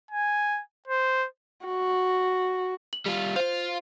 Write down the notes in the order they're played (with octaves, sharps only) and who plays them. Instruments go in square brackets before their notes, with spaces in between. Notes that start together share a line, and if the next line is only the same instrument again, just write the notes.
[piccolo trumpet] G#5
C5
[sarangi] F#4
[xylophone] F#7
[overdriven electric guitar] G3 F4
[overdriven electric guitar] F4 F5 [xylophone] C5 F7